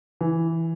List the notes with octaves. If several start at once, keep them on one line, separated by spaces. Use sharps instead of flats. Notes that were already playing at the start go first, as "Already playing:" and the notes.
E3